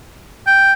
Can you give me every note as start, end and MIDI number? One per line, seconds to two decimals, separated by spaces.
0.46 0.73 79